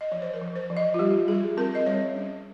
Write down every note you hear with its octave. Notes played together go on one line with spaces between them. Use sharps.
D#5
F3 C#5
C5
A#4
F3
C5
F3
D#5
F4
G3 G4
G3 G#4
C4 A#4
D#5
G3 C#5
C#4